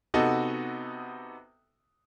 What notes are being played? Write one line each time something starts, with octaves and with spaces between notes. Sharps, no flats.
C3 B3 D#4 F#4 A4